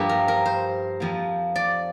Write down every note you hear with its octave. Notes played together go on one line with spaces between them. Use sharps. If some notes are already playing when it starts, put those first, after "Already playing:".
Already playing: G2 F3 A#3 G4
A#4
A#4
C5
F2 F3 A#3
D5